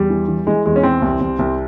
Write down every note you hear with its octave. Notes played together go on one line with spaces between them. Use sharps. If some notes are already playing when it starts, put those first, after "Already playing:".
Already playing: E2 G3
E3
E3
E3 G#3
E2 G#3
C#4
E3 C4
C2
C2
C2